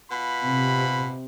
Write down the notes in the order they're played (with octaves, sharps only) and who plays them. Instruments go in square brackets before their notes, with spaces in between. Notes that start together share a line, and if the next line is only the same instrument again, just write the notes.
[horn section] B2 F4 B5
[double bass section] C3